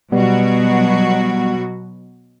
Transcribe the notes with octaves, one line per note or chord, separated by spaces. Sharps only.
B2 F#3 G3 B3 F#4